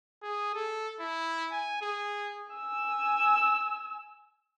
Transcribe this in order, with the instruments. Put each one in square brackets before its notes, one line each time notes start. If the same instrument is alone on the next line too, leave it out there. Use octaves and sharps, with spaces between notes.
[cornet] G#4
A4
E4
G#5
G#4
[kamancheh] G#5 E6